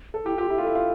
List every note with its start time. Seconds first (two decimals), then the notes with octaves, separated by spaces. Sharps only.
0.14 A4
0.25 E4 G4
0.38 F4 G4
0.50 E4 G4
0.58 F4
0.62 E4 A4
0.75 F4